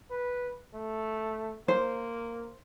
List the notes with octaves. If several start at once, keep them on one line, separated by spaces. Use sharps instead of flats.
B4
A3
A#3 C5